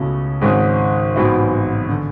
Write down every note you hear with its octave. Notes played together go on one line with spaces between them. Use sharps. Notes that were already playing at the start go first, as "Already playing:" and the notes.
Already playing: C#2 B2 A3 C#4 E4
G#1 G#2 G#3 C#4 G#4
A1 G#2 F#3 B3 E4
D3